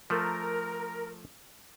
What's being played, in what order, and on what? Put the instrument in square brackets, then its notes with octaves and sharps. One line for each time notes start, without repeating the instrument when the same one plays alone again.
[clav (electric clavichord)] F3 A3 [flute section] A#4